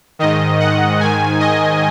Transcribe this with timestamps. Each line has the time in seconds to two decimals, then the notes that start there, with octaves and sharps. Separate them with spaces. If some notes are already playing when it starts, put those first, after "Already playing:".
0.19 G#2 D#3 D#5
0.60 F#5
1.00 G#2 D#3 G#5
1.40 D#5